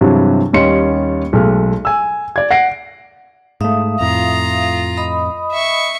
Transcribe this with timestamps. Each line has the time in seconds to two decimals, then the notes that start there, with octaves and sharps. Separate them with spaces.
0.01 G2 C3 E3 F#3 G#3
0.53 D#2 G3 C#4 D#5 C6 C#7
1.33 B1 G#3 A3 F6
1.85 G#5 E6
2.36 D5 G#6
2.51 F#5 A#6 C7 D7
3.61 G#2 A3 E5 F5 D#6
4.00 F2 A2 F4 A#5
4.97 D#5 B5 D#6
5.52 E5 C#6